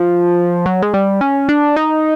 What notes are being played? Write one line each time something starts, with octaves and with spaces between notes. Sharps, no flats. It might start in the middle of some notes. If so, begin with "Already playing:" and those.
Already playing: F3
F#3
G#3
G3
C#4
D4
D#4